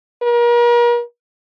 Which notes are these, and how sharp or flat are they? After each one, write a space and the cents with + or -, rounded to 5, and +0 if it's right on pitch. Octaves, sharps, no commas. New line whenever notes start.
A#4 +40